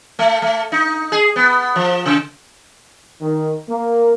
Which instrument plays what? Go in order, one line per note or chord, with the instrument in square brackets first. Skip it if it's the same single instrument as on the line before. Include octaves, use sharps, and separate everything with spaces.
[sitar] A3
A3
D#4
G#4
B3
F3
C#3
[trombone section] D#3
A#3